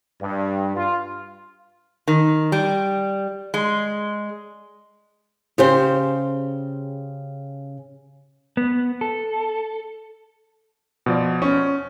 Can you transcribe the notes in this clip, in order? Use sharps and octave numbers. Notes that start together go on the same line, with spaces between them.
G2
F4
D#3
G3
G#3
C#3 G4 C5 G5
B3
A4
B2 F3 D5
C#4